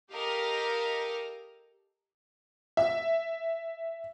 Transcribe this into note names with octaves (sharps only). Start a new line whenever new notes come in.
G4 A4 A#4 D#5 F5
E5